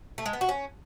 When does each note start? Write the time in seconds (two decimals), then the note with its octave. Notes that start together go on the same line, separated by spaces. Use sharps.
0.18 A3
0.26 G#3
0.33 B3
0.41 F#4
0.49 C#4